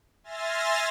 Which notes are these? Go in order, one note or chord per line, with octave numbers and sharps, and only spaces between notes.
E5 G#5 C6 F6 A6 A#6